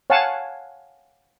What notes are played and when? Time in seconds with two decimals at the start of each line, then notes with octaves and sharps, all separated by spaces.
0.10 C#5 F5 F#5 G#5 A5